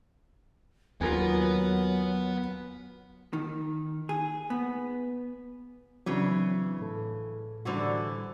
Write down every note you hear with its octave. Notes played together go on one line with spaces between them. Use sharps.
D#2 F#3 B3 F4 A#4 B4 G#5
D#3
G#4
B3
C#3 E3 F#3 C4 D4
A2 A4
A2 D3 E3 G3 F#4 C5